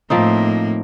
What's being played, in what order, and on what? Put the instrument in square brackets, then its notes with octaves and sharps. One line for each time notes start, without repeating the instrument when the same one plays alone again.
[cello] A2 A#3 [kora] F3 C4 D#4